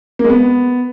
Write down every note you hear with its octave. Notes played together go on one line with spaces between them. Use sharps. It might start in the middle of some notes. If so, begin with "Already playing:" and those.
A#3
G#3
B3